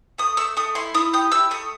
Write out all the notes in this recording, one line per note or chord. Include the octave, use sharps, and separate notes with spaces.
A3 D#6
A3 E6
A3 D#6
E4 C6
E4 D#6
G4 D#6
E4 E6
A3 D#6